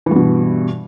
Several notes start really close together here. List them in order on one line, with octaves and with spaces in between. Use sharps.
E3 G2 B2